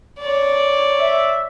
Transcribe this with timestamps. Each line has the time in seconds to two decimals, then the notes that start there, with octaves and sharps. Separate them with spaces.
0.20 C#5 D5
1.00 E5